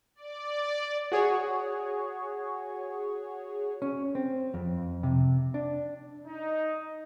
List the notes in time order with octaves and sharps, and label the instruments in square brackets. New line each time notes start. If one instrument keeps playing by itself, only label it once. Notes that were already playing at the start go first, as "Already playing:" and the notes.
[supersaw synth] D5
[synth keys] F#4 G#4 C#5
[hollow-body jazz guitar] C#4
C4
F2
C3
D4
[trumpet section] D#4